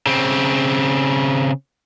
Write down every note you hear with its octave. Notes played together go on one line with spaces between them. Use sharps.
C#3 C4